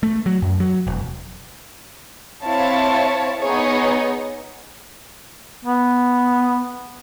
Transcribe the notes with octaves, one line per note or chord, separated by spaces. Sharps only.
A3
F#3
F#2
F#3
E1
C4 E4 C#5 F5 A5
B3 D#4 G#4 C#5
B3